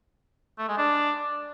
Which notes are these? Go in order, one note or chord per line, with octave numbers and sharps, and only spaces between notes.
A3
G#3
D4